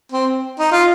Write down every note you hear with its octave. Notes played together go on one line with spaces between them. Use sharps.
C4
D#4
F4